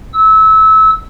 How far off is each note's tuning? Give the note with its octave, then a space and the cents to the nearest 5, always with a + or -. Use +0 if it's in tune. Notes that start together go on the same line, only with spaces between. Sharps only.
E6 -25